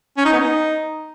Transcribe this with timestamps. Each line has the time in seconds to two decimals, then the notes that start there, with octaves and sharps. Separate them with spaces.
0.17 C#4
0.25 D#4
0.33 B3
0.40 D#4